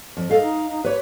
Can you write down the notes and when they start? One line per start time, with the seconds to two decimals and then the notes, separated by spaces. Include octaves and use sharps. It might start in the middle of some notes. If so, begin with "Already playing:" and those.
0.17 F2
0.30 A4 D#5 F5
0.42 D#4
0.69 D#4
0.84 G4 B4 C#5